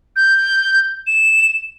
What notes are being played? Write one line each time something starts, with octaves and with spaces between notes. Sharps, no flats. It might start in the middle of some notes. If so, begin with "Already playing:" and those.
G6
E7